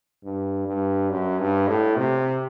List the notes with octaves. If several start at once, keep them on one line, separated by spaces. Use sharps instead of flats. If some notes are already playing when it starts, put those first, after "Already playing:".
G2
G2
F#2
G2
A2
C3